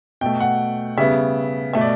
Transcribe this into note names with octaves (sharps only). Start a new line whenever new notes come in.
B2 A3 G5
F#5
C#3 G3 B3 E5
B2 A3 E5
D5